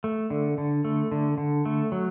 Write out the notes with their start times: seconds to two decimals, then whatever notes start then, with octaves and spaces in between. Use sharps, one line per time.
0.04 A3
0.30 D3
0.58 D3
0.85 A3
1.12 D3
1.38 D3
1.65 A3
1.92 F#3